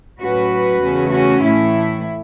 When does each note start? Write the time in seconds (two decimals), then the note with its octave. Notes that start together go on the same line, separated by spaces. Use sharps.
0.21 A2 F#3 C#4 F#4 B4
0.82 E2 C#3 A3 C#4
1.12 C#4 F#4
1.42 A2 E3 A3 E4